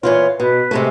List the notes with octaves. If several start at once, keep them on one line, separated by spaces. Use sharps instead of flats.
A#2 E3 F4 C#5
B2 B4
C3 G#3 A3